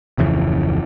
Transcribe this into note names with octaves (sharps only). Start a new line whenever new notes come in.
D1 F2 C#3 E3